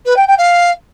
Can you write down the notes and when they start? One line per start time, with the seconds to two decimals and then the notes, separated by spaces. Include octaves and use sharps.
0.05 B4
0.16 G5
0.27 G5
0.38 F5